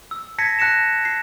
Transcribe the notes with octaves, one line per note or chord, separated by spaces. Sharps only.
E6
A5 G#6 A#6 B6 C#7
A5 F#6 A#6 C#7 E7
C7